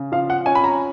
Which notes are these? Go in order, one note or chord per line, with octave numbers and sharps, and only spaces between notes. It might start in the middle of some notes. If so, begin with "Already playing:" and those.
Already playing: C#3
F3 F5
F#5
C#4 G#5
B5
A#5